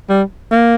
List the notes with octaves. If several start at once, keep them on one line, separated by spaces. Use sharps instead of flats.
G3
A#3